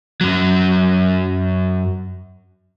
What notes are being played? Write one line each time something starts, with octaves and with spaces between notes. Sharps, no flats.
F#2 F#3